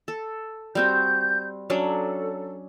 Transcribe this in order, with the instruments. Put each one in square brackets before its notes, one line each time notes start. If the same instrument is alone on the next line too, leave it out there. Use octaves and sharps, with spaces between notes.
[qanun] A4
[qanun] G3 C4 F#4 [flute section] G6
[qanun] F#3 C#4 D4 [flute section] A4